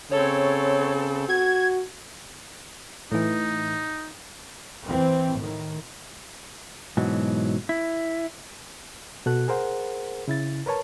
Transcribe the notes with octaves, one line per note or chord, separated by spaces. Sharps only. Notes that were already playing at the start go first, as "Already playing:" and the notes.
C#3 C4 A4 C#5
F#4 G#6
A2 E3 D#4
E3 C4
A2 D#3
G#2 B2 E3 F#3
E4
B2 F#4 A4 F#6
G#4 A#4 C5 F#5
C#3 E4 A6
A#4 B4 C#5 A5